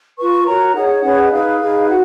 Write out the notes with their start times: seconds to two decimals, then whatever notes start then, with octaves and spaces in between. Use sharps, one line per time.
0.18 F4 B4 C#6
0.46 F#4 A#4 C#5 A#5
0.74 D#4 G#4 C#5 F#5
1.03 C#4 G#4 B4 C#5
1.19 D#5
1.31 D#4 G#4 B4 F5
1.60 D#4 G#4 B4
1.88 F#4 F#5